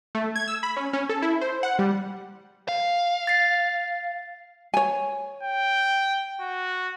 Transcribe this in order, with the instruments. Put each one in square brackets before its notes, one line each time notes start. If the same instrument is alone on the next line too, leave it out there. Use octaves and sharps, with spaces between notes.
[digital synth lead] A3
G#6
E6
B5
C#4
C#4
A4
E4
C5
F#5
G3
[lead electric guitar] F5
[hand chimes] A6 C7
[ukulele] C#5 G#5
[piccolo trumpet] G5
F#4